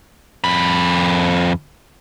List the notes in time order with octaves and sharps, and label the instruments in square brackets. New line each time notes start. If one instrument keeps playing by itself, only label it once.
[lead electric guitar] F2 B5